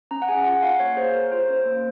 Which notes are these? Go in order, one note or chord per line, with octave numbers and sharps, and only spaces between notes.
C#4 A#5
F#5
G#4 G#5
F4 F#5
F4 F5
A#3 C#5
G#4 C5
G#4 A#4
F4 C5
C#4 C5
A#3